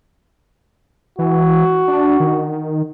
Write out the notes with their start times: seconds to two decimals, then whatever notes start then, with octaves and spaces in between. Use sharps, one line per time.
1.19 E3 F#4
1.88 D4
2.20 D#3